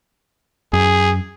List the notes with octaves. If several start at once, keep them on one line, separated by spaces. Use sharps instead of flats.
F#2 G#4